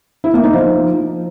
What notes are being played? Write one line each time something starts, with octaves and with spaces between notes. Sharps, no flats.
E4
A#3
D#4
F3